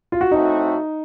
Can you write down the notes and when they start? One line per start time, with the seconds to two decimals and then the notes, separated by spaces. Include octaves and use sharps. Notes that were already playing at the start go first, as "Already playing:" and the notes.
0.12 F4
0.21 F#4
0.31 A2 A3 C4 D#4 F#4